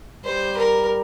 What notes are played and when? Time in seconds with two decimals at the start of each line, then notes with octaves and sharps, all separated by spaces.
0.25 G3 C5
0.57 A#4